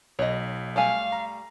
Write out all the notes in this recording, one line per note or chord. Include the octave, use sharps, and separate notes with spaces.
B1 C#5 D#5
G3 A3 F5 G#5
A#5